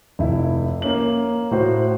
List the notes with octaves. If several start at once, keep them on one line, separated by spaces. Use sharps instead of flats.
F1 E4
A#3 C#4 F#7
A2 F#4 C5